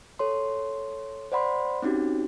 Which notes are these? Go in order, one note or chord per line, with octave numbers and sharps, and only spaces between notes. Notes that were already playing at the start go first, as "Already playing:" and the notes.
A4 C#5 C6
C5 D5 F#5 B5 C6
C4 C#4 D#4 F#4 G4